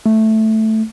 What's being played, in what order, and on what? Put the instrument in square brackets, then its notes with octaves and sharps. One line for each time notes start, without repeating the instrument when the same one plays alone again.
[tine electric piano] A3